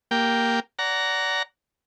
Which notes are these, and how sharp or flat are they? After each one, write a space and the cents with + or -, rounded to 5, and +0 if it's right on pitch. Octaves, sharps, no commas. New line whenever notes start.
A#3 +0 G4 +0 G5 +0
D5 -30 F#5 +10 A#5 +0